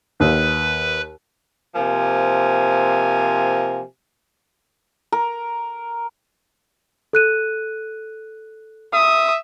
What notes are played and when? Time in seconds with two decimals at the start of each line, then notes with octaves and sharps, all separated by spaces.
0.20 D#2 B4
1.74 C3 F3 A#3 G#5
5.12 A#4
7.13 A4 F#6 D#7
8.94 E5 D#6